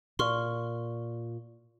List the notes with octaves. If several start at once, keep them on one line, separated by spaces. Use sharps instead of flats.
A#2 C6 C#6 F6